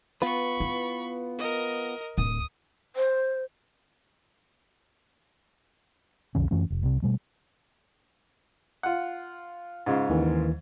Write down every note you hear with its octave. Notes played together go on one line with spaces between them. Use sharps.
B3 F4 B4 B5 C#6
E4
A#4 D#5
D1 D#6
C5
B1 F2 D3 C#4
F#2 E3 A3 C#4
F1
C2 C3
B2 G3 A3
F4 F#5
G#2 C#3 F4
D#2 D#3 E3